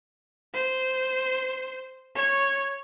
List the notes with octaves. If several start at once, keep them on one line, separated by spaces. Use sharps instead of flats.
C5
C#5